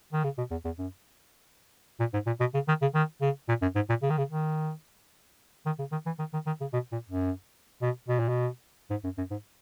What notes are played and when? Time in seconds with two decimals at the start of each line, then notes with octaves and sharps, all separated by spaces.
0.13 D#3
0.24 C#3
0.38 B2
0.51 E2
0.65 E2
0.78 F#2
2.00 A#2
2.13 G#2
2.26 A#2
2.40 B2
2.54 C#3
2.68 D#3
2.82 C#3
2.94 D#3
3.22 C#3
3.49 A#2
3.62 F#2
3.75 G#2
3.89 A#2
4.02 C#3
4.10 D#3
4.18 C#3
4.30 D#3
5.66 D#3
5.79 C#3
5.92 D#3
6.06 E3
6.19 D#3
6.33 D#3
6.46 D#3
6.61 C#3
6.73 B2
6.92 A#2
7.09 F#2
7.82 B2
8.08 B2
8.19 A#2
8.29 B2
8.90 G#2
9.04 F#2
9.18 F#2
9.31 G#2